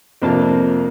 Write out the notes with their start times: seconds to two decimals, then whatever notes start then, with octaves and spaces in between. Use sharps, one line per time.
0.22 F2 C3 A#3 D4 F4 A5